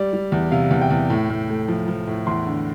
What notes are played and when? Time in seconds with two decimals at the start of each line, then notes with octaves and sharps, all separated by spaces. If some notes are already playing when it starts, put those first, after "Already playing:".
Already playing: G3 D5
0.13 G3
0.32 E2
0.51 C3 F5
0.71 E2
0.81 G5
0.91 E2
1.10 A2
1.30 A2
1.49 A3
1.68 F3
1.88 F3
2.07 A2
2.27 E2 C6
2.46 D3